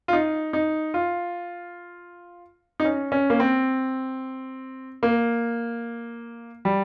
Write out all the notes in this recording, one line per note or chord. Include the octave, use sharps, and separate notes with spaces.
F4
D#4
D#4
F4
D#4
C#4
C#4
A#3
C4
A#3
G3